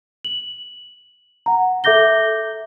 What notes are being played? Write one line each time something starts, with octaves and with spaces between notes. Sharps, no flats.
F#7
F#5 A#5
A4 E5 D6 G6 A#6 G7